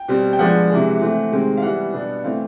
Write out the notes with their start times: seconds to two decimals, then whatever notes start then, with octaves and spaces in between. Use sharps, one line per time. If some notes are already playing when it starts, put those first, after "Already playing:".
Already playing: G5
0.08 B2 G3 C4
0.33 G5
0.39 F3 G#3 B3 D4 F#5
0.70 C3 E3 G#3
1.01 E3 A3 C4
1.32 C3 D#3 G#3 C4
1.57 F5
1.62 E3 G3 B3 F#5
1.94 B2 G3 B3 D4
2.24 E3 A3 C4 F5